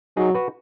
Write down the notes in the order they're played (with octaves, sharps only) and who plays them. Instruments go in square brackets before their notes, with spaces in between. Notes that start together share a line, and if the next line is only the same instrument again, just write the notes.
[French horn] F#3 [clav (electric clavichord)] D#4 G#4
[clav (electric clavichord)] F#4 B4